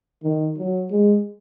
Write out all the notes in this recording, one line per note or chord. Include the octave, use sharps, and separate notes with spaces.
D#3
F#3
G#3